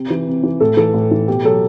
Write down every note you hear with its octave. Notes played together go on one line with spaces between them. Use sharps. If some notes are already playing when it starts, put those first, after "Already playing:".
Already playing: C3 G4
E3
C3
E3
A2 A4
E3 A4
A2
E3
B2 G4
F#3 A4